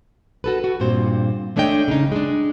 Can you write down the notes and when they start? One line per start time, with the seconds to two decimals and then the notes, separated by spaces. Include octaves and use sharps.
0.44 F#4 A4 B4
0.64 F#4
0.80 G2 A#2 C4 C5
1.56 G#3 A3 D4 C#5 D#5 G5
1.88 C#3 D#4
2.12 G#3 D4